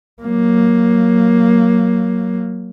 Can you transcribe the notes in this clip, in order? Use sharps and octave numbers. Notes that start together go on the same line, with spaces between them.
F#3 A#3